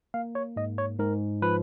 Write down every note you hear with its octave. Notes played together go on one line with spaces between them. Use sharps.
A#3 F5
C#5
G#2 D#5
C#5
G#2 A#4
F3 B4